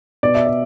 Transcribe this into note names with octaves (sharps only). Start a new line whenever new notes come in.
B2 D5
E5
D5